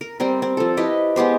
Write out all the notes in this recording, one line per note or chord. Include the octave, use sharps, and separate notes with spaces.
A#4
G3 C4 A#4
C4
F3 A4
E4 G4 B4 D#5
G#3 B3 G4 C5